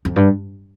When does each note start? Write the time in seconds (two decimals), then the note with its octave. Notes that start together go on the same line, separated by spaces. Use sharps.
0.05 F2
0.16 G2